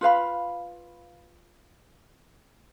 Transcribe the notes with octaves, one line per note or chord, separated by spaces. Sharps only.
F4 B4 F5 B5